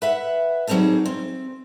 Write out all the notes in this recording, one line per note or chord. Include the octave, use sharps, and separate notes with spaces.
B4 E5 F#5
D#3 F#3 G3 C4 G#4 A4
C4